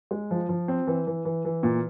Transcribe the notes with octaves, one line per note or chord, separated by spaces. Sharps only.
G#3
F3
F3
C4
E3
E3
E3
E3
A#2